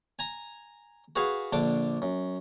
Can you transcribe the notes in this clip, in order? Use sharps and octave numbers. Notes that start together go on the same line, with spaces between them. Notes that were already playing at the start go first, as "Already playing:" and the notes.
G#5 A#5
F#4 G#4 B4 F5 G#5
A#1 D3 D4 D6
F#2